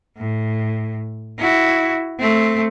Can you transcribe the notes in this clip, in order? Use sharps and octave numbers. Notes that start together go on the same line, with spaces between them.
A2
E4 F#4
A3 C4